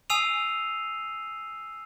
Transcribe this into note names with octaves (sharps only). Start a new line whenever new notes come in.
G#5 D#6 E6 C7 D#7 F7